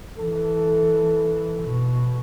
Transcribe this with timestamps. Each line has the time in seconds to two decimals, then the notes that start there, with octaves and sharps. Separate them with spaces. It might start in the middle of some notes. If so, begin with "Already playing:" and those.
0.19 E3 A4
1.61 B2